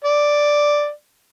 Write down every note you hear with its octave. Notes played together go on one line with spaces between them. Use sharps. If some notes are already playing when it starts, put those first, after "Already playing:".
D5